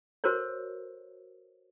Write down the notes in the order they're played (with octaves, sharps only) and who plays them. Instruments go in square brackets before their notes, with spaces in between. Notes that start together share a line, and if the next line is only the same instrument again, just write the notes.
[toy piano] F#4 A4 A#4 C5 C#5